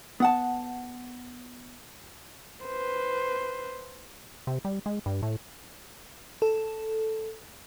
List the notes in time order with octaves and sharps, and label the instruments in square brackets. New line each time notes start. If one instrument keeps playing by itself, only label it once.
[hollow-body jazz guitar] B3 F#5 A5
[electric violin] B4 C5
[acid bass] C3
G3
G#3
G2
A2
[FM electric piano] A4